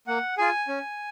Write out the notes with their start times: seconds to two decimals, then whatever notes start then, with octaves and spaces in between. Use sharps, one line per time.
0.07 A#3 F#5
0.38 F4 G#4 G#5
0.68 C#4